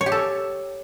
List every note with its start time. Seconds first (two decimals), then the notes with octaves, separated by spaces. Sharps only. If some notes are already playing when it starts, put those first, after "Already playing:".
0.01 C#5
0.06 G4
0.12 A4